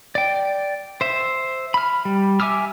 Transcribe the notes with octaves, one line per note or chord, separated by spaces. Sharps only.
D5 G5
C5 E5
B5 F6
G3
E5 G#5 D6 E6 F6